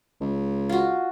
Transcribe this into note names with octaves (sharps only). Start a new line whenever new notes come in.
C#2
F4 F#4